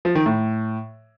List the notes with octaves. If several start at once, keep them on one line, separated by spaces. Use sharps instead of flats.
F3
D#3
A2